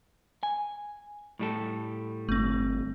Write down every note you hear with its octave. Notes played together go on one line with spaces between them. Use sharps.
G#5
A2 G3 A4
G1 A3 C4